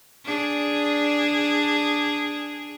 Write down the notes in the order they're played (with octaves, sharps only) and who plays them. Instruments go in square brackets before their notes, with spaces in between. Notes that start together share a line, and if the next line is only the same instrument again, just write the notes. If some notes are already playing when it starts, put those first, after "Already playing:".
[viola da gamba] D4 G#4